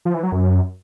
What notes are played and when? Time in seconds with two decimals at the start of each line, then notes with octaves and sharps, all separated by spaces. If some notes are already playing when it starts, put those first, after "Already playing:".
0.05 F3
0.14 E3
0.23 F#3
0.32 F#2